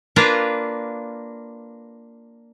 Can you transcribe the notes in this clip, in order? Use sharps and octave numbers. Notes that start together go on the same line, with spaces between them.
A#3 D4 F4 B4 A#5